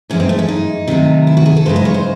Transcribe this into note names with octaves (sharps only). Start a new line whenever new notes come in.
F#2 E3 G#3 C#4
C4
A3
C#4
D#4
C3 D#3 F#3 A3
E4
F#4
G#4
A4
F#2 C#3 E3 G#3 C5
D#5
C#5
C5